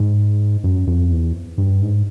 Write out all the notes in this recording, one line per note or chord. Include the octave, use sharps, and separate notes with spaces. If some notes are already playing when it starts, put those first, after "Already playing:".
Already playing: G#2
F#2
F2
E2
G2
G#2